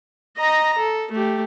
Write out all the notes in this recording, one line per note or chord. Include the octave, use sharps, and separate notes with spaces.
D#5 A#5
A4
A3 G4